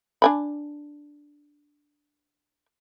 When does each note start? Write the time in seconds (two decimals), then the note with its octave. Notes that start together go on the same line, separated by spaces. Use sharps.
0.22 D4 G#5 B5